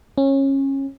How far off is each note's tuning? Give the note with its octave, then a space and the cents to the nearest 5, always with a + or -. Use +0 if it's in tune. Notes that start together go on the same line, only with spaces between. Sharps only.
C#4 -25